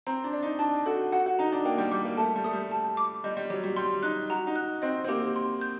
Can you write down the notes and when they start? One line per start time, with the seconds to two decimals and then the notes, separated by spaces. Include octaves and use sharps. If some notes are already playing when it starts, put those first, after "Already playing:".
0.07 C4 A#5
0.24 D4
0.33 D5
0.43 D#4
0.59 D4 A5
0.86 F#4 A4
1.12 F#4 F#5
1.26 F#4
1.39 D#4 A#5
1.52 D4
1.65 A#3 G5
1.78 G3
1.91 G3 D6
2.05 A#3
2.17 A3 A5
2.36 G3
2.44 A3 D#6
2.53 G3
2.72 A5
2.97 D6
3.24 G3 D#5
3.37 G3
3.50 F#3 G4
3.64 G3
3.76 G3 C6
4.03 D#4 F#6
4.30 F#4 A#5
4.47 D#4
4.56 F#6
4.82 C4 D#5
5.04 C4
5.08 A#3 G4
5.36 C6
5.61 G6